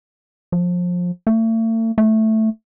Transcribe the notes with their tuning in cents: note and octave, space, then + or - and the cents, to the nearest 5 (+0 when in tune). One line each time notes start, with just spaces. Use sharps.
F3 +25
A3 +40
A3 +0